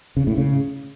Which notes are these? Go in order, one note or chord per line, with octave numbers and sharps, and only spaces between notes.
C#3
A2
C#3